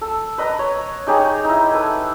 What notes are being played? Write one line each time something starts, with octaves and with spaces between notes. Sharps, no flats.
A4
B4 D#5 A#5
C#5
D#4 G4 G#4 C#5
D#4 E4
A4 B4